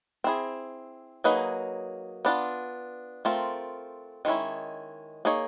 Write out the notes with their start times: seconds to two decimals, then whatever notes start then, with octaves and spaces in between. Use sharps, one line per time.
0.24 C4 E4 G#4
1.24 F#3 A#3 D#4 G#4 B4
2.25 B3 D4 F4
3.25 A3 C4 F4 A#4
4.25 D#3 G#3 C#4 E4
5.25 A#3 D#4 G#4 C#5